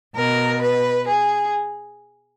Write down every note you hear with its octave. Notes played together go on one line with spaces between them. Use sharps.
B2 A#4
B4
G#4